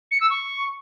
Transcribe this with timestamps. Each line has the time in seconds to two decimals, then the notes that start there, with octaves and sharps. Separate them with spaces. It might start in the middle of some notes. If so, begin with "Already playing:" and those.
0.11 C#7
0.21 E6
0.30 C#6